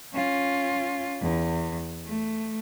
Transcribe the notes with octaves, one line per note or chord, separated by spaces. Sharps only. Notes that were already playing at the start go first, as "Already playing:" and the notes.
C#4 F4
E2
A3